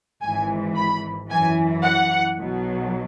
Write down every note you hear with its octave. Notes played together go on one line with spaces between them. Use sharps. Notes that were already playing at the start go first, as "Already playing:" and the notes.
G#1 G#2 E3 G#5
B5
F#2 E3 G#5
F#5
B1 B2 F#3